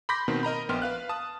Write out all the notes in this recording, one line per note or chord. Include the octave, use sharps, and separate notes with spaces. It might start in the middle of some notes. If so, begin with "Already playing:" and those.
B5 C6 D6 G6 A#6 B6
B2 D#3 A#3 C4
A#4 D#5 A#5 B5
A#1 B3 G5 C6 F6
B4 F5 F#6
A5 D#6